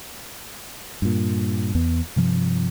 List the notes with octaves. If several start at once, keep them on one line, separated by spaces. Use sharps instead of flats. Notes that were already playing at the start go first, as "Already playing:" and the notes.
G2 A#2
E2 B3
G2 C3 F3